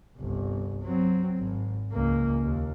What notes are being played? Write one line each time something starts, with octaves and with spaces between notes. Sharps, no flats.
G1 C2
F#3 C4
G#1
C#2 A#3
D#2